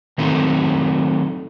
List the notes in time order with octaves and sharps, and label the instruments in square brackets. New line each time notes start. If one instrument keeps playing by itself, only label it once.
[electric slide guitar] D#3 F#3 A3 C4 D#4